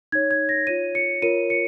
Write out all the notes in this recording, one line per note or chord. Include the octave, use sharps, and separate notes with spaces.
D#4 C#5 G#6
G#6
A#6
F4 C#5 D#7
C#7
F4 A#4 C#5 D#7
C#7